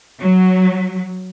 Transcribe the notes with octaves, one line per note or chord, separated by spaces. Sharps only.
F#3